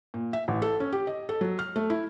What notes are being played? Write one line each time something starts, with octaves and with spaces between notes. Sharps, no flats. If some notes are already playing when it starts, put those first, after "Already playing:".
A#2
E5
A1
A4
C#4
G4
D#5
A4
F#3
F6
A3
E4